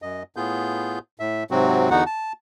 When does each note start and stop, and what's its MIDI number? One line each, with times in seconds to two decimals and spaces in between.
0.02 0.23 42
0.02 0.23 75
0.36 0.99 45
0.36 0.99 59
0.36 0.99 65
0.36 0.99 68
0.36 0.99 91
1.20 1.44 45
1.20 1.44 76
1.51 1.90 44
1.51 1.90 48
1.51 1.90 54
1.51 1.90 60
1.51 1.90 66
1.90 2.04 40
1.90 2.04 50
1.90 2.04 59
1.90 2.04 63
1.90 2.04 66
1.90 2.04 78
2.06 2.33 81